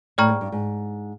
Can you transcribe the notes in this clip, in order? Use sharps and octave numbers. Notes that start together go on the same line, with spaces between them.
A2 D5 G5 A#5 C#6 F6
G#2
G2
G#2